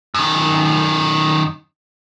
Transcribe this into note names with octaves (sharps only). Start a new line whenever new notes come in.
F#2 D#3